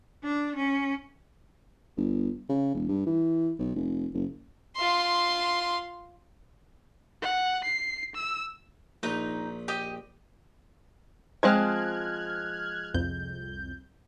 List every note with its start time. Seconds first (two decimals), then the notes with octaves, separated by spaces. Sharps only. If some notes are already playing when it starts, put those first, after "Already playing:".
0.24 D4
0.56 C#4
1.97 G1
2.49 C#3
2.74 E1
2.89 G2
3.06 E3
3.59 B1
3.76 F1
4.14 F#1
4.76 F4 C6
7.22 F#5
7.64 C7
8.15 E6
9.03 A#1 D#4 B4
9.68 G4 D#5
11.43 F3 G#3 C4 F6 F#6 G#6
12.94 C2 F2 G6